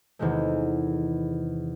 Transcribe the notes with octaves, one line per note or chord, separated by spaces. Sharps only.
E2 C3 D#3 G#3 A3